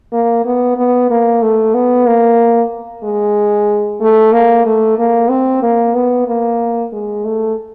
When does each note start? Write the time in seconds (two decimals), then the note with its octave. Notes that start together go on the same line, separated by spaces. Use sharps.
0.12 A#3
0.45 B3
0.77 B3
1.10 A#3
1.42 A3
1.74 B3
2.06 A#3
3.03 G#3
4.01 A3
4.33 A#3
4.66 A3
4.98 A#3
5.29 C4
5.62 A#3
5.94 B3
6.28 A#3
6.92 G#3
7.25 A3